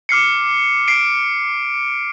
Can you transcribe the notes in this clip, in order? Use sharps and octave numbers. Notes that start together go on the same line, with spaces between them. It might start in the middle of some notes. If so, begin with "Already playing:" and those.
D6 F6 C7 C#7
C7 D7